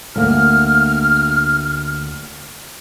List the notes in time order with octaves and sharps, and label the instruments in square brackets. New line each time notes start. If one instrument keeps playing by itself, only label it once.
[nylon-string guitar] D2 A#3 [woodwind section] F6